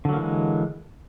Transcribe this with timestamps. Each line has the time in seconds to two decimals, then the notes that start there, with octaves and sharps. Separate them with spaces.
0.05 D3
0.09 F#3
0.13 A#3
0.17 E3
0.20 G#3